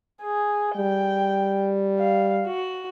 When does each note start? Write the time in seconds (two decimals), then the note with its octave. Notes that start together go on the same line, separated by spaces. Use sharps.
0.23 G#4
0.76 G3 G5
2.00 F5
2.46 F#4